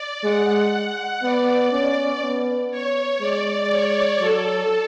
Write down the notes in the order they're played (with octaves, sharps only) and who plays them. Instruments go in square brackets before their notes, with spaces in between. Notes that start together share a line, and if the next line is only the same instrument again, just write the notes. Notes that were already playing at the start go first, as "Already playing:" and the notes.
Already playing: [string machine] D5
[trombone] G#3 [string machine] F#5
[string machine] F#5
[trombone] B3 [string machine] D5
[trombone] C#4
B3
[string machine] C#5
[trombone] G#3 [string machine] D5
[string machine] C#5
[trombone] F#3 [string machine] A4